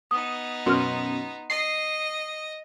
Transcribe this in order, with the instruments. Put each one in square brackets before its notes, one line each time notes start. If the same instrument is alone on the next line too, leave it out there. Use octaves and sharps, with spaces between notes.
[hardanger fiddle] B3 D#4 [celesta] D#6
[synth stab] F#2 B2 [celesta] C6 F6
[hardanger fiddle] D#5 [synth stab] C7